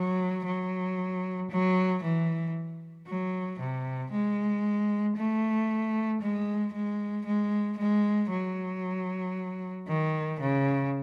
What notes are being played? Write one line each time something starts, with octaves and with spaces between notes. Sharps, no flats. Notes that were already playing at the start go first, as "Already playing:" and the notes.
Already playing: F#3
F#3
F#3
E3
F#3
C3
G#3
A3
G#3
G#3
G#3
G#3
F#3
D#3
C#3